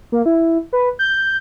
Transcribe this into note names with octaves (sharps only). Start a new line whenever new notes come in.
A#3
E4
B4
G6